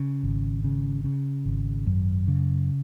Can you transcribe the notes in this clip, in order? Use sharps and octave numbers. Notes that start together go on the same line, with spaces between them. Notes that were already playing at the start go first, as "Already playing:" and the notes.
Already playing: C#3
G#1
C#3
C#3
G#1
F#2
C#3